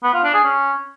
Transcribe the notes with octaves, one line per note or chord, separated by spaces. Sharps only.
B3
F4
D4
G#4
C#4